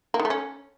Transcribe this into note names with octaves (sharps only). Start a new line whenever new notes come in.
A#3
D#3
A3
C#4